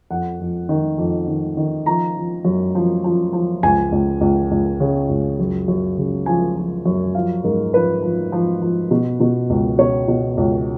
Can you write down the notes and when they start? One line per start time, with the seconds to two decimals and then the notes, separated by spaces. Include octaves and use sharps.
0.10 F2 F#5
0.40 F2
0.69 D#3
0.98 F2
1.28 D#3
1.57 D#3
1.86 F3 A#5
2.16 F3
2.45 F#2
2.75 F3
3.04 F3
3.33 F3
3.63 C#2 G#5
3.92 C#2
4.21 C#2
4.51 C#2
4.80 C#3
5.09 C#2
5.39 F#2
5.68 F#2
5.98 C#3
6.26 F3 G#5
6.56 F3
6.86 F#2
7.15 F3 F5
7.44 G#2 A#4
7.73 F3 B4
8.02 F3
8.32 F3
8.62 F3
8.91 B2
9.20 B2
9.50 C#2
9.79 B2 C#5
10.08 B2
10.37 C#2